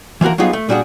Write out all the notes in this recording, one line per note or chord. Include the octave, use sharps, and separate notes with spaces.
E3 F3 A#3 F#4 A#4
F#3 G3 B3 D#4 F4 G#4
A3
A#2 G3 D4 F#4 G#4